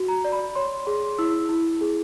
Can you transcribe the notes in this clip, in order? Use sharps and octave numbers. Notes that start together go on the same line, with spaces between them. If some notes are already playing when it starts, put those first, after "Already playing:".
Already playing: F#4
A#5
D5
B5
C#5 C6
G#4 C6
E4 E6
E4
G#4